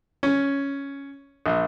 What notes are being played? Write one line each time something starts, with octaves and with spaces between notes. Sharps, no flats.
C#4
A#1